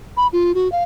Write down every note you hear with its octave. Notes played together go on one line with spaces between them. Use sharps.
B5
F4
F#4
F5